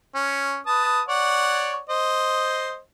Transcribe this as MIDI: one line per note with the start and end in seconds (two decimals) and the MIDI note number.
0.15 0.59 61
0.67 1.01 71
0.67 1.01 81
0.67 1.01 87
1.08 1.79 73
1.08 1.79 74
1.08 1.79 78
1.89 2.79 72
1.89 2.79 75